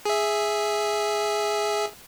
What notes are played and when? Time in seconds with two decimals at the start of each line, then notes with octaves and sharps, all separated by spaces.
0.05 G#4 E5